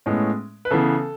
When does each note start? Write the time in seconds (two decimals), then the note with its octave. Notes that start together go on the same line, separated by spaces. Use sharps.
0.06 A2 G#3 B3 C#4
0.65 B4
0.70 C#3 E3 B3 A4